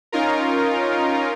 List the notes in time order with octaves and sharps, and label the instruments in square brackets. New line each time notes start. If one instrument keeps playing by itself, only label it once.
[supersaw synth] C#4 D#4 F4 A#4